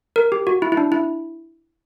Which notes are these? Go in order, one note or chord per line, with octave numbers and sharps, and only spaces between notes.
A#4
G4
F#4
E4
E4
D4
E4